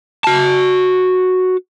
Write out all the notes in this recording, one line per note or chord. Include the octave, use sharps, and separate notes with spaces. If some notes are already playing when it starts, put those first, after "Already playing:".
F#4 A5